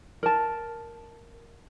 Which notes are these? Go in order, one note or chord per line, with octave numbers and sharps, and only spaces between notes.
A#4 A5